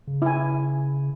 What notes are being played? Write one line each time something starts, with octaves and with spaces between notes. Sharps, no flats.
C#3
E4 G#5